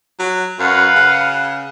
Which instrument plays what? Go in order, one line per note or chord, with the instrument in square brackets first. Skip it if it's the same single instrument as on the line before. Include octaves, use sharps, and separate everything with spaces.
[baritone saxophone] F#3
[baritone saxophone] F#2 [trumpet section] B4 F5 F#5
[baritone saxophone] C#3